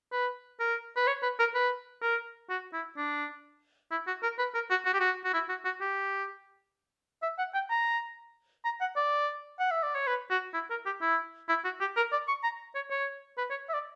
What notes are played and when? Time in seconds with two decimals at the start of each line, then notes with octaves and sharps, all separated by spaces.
0.12 B4
0.60 A#4
0.96 B4
1.07 C#5
1.23 B4
1.39 A#4
1.55 B4
2.02 A#4
2.50 F#4
2.73 E4
2.97 D4
3.91 E4
4.07 F#4
4.23 A#4
4.39 B4
4.54 A#4
4.70 F#4
4.86 F#4
4.93 G4
5.00 F#4
5.25 F#4
5.34 E4
5.49 F#4
5.65 F#4
5.81 G4
7.23 E5
7.38 F#5
7.54 G5
7.70 A#5
8.65 A#5
8.81 F#5
8.96 D5
9.60 F#5
9.71 E5
9.83 D5
9.95 C#5
10.07 B4
10.30 F#4
10.54 E4
10.70 A#4
10.86 G4
11.02 E4
11.49 E4
11.65 F#4
11.80 G4
11.97 A#4
12.12 D5
12.28 C#6
12.44 A#5
12.75 C#5
12.90 C#5
13.38 B4
13.50 C#5
13.69 E5
13.74 D5